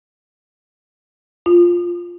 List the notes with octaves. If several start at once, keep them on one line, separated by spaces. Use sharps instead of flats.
F4